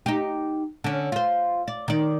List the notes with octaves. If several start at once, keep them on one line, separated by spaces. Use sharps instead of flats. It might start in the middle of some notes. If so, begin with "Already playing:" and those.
D#4 G4
D3 C#4
F4 C5
D5
D#3 D5